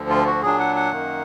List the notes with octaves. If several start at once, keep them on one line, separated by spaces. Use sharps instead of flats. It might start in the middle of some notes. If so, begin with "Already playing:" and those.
Already playing: D2 D3 F3
F4
F#4
A#2 F#3 D4 G#4
F#5
F#5
F#2 D#3 A#3